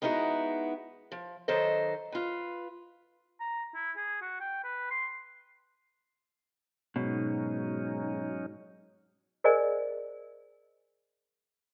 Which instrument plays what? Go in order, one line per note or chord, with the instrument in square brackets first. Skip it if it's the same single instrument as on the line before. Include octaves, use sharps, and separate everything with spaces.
[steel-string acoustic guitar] G#3 B3 D#4 E4 F#4
F3
D#3 F#3 A4 C5 D#5
F4 B4
[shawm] A#5
E4
G#4
F#4
G5
B4
C6
[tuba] G#2 [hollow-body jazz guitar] B2 [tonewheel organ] F#3 C#4 D#4
[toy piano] G#4 A#4 C5 D5 D#5 G#5